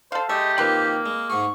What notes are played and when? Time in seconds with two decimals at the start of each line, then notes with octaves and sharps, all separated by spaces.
0.12 A4 C5 F5
0.29 G#3 A3 G4 E5
0.58 D#3 F3 A#3 C4 B4
1.06 G#3
1.30 G#2 G#4 C#6